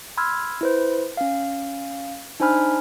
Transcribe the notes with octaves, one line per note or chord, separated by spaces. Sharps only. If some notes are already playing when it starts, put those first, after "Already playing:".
B5 C6 E6 F6 G#6
E4 B4 C5
C#4 F5
D4 D#4 C5 G#5 B5 F6